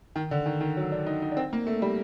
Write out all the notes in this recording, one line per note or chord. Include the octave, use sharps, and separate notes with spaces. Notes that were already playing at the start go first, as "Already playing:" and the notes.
D#3
D3
D#3
D#3
F#3
D4
D#4
D#4
D4
C4
A#3
A3
G3